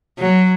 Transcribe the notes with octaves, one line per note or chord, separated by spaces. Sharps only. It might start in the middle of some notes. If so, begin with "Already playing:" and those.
F#3